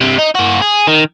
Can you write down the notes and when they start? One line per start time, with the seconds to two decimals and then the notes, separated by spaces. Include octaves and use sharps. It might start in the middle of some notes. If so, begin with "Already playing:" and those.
0.01 G2 C3
0.18 D#4
0.35 A#3 F#4
0.61 G#4
0.87 D#3